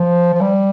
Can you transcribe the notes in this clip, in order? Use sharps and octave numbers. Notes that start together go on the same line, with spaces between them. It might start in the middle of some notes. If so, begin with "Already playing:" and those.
Already playing: F3
F3
G3